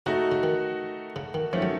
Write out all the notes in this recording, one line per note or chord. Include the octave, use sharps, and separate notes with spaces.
C#3 A3 D#4 F#4
C#3
D#3
C#3
D#3
D#3 F3 A3 C#4
F#3